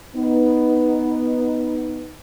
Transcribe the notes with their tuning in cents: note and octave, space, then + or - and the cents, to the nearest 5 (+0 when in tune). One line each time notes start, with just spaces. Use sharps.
B3 +0 D#4 +0